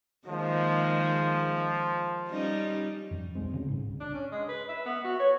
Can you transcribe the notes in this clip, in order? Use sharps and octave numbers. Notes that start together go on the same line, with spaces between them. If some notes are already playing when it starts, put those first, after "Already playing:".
D#3 F3 G#3 A#3
G3 C#4 D#4
F2
D#1 B1 G#3 C4
D2 C#3
C2 G#2
D4
C#4
G#3
B4
E5
B3
F#4
C#5